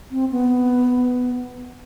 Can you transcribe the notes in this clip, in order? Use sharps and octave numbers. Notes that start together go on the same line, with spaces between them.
C4
B3